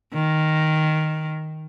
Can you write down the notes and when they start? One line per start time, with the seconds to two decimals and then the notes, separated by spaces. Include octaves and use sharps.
0.13 D#3